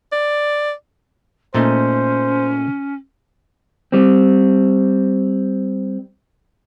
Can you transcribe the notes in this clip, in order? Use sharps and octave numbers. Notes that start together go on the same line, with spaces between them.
D5
A#2 A3 C#4 D#4 C5
G3 C4